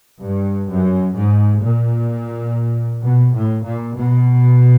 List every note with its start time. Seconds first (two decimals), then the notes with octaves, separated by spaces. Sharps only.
0.23 G2
0.70 F#2
1.16 G#2
1.63 A#2
3.03 B2
3.35 A2
3.66 A#2
3.97 B2